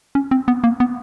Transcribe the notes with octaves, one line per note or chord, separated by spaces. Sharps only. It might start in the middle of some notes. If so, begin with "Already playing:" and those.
C#4
C4
B3
A#3
B3